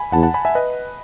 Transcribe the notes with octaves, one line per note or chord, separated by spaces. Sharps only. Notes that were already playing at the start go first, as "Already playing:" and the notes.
Already playing: G#5 B5
E2 F#5 A5
F#5 A5
G#5 B5
E5 G#5
B4 D#5